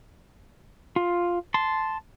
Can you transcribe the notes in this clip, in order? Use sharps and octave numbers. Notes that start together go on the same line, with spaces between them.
F4
A5 C6